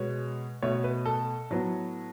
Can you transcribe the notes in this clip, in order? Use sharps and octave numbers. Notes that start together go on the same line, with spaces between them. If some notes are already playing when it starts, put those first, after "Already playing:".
Already playing: B2 G#3 B3 C#5
B2 A3 C#5
B4
A4
A2 F#3 B3